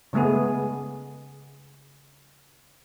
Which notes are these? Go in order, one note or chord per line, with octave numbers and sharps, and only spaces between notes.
C#3 G#3 A3 B3 G#4